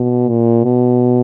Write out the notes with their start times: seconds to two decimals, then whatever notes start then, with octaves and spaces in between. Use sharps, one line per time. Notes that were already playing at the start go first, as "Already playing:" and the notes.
Already playing: B2
0.29 A#2
0.64 B2